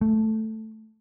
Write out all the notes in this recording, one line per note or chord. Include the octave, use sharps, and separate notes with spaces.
A3